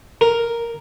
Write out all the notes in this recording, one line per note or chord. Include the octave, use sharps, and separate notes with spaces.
A#4